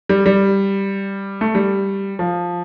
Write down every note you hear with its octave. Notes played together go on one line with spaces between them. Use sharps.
G3
G3
A3
G3
F3